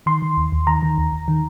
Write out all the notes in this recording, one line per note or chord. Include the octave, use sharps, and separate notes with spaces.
D#3 C6
D#3
D#2
D#2
D#3 A#5
D#3
D#2
D#2
D#3